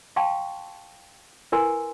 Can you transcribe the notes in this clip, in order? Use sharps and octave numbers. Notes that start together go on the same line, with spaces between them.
F5 G5 A5 C6 C#6
E4 A#4 B4 G#5 C6